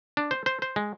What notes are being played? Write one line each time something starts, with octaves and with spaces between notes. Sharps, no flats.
D4
C5
C5
C5
G#3